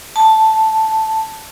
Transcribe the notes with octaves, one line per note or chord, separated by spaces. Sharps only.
A5